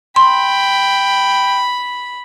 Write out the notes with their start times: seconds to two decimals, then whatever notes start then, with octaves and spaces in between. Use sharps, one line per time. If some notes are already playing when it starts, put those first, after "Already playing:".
0.16 G5 B5 C6